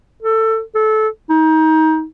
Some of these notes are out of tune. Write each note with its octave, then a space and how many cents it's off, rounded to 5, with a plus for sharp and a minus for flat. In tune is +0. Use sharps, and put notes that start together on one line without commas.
A4 +20
A4 -20
D#4 +25